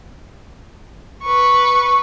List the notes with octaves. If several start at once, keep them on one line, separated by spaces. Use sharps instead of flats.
B4 C#6